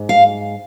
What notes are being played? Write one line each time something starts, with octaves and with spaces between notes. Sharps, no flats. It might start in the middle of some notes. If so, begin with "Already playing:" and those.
Already playing: G#2
F5